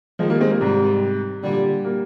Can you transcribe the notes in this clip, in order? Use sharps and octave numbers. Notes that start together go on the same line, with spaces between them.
D#3 F3 G#3
G3 A#3
G#3 C4
G3 A#3
G#2 C3 G3
A#2 D3 G3
G3 A#3